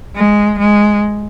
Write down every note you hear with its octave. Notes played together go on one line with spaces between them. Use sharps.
G#3
G#3